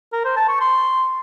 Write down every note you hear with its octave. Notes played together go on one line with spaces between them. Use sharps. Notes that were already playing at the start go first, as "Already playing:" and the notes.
A#4
C5
A5
C#6
C6